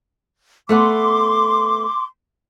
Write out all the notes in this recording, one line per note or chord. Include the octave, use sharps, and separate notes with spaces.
A3 B3 F#5 C6 D6